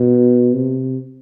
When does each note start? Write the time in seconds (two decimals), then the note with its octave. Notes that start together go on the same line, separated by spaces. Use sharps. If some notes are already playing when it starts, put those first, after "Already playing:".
Already playing: B2
0.54 C3